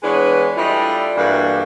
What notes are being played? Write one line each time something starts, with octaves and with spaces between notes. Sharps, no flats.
E3 G#3 B3 D4 B4 C#5
G3 A3 D4 E4 F4 D#5
G2 E3 A3 A#3 D4 F#4